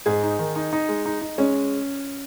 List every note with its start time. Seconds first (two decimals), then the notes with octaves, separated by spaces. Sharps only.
0.06 G#2 G#4
0.23 D#4
0.39 D#3
0.56 D#4
0.73 D#4
0.89 G#3
1.06 D#4
1.21 D#4
1.38 G#3 C#4